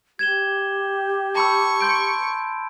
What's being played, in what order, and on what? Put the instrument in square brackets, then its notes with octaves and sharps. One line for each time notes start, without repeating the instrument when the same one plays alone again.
[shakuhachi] G4 [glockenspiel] G#6 E7 G7
[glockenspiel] A5 B5 E6 [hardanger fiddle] C#6
[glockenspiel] C6 G6 D7